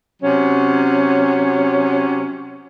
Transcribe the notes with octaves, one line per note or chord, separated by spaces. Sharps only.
C3 F#3 C#4